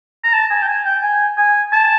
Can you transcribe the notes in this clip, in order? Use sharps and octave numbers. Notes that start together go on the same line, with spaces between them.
A#5
A5
G#5
G5
G#5
G5
G#5
G#5
A5